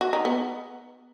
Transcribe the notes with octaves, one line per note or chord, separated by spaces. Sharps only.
F#4
D#4
B3